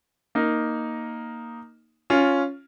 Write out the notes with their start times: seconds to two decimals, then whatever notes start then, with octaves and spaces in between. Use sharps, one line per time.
0.35 A#3 D#4
2.10 C#4 F4